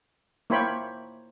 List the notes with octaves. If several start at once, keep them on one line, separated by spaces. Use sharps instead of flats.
A#3 E4 C5 C#5 G5 B5